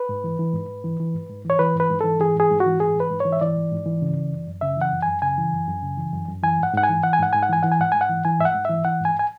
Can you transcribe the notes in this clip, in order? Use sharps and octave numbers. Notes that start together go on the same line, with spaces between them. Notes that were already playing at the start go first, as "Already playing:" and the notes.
Already playing: B4
G#2
E3
E3
G#2
G#2
E3
E3
G#2
G#2
E3 C#5
E3 B4
G#2
B4
G#2
E3 A4
E3 G#4
G#2 G#4
G#2
F#4
E3
E3 G#4
G#2
B4
G#2
C#5
E3
E5
E3 D5
G#2
G#2
E3
C#3
E3
F#2
F#2
C#3 E5
E3 F#5
F#2
G#5
F#2
C#3 G#5
E3
F#2
F#2
C#3
E3
F#2
F#2
E3 G#5
G#2 F#5
G#2 F#5
G#5
E3
E3 F#5
G#5
G#2 F#5
G#2 G#5
F#5
E3 G#5
E3 F#5
G#5
G#2 F#5
G#2 G#5
F#5
E3
E3 G#5
G#2 E5
F#5
G#2
E3 E5
E3 F#5
G#2 G#5
G#5